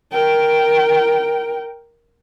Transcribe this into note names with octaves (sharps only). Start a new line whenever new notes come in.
A#4 G5